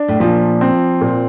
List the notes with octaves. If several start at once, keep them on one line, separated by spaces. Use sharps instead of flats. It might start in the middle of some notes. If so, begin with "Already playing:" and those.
Already playing: D4
A2
A#2 F3
C4
A#2